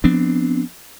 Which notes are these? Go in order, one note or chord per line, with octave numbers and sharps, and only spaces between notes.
F3 B3 C4 D4